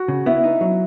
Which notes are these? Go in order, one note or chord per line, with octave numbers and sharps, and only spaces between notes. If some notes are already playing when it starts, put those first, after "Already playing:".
Already playing: F#4
C#3
B3 E4
D#4
F#3